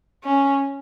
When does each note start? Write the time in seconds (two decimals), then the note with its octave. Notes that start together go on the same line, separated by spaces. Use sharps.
0.24 C#4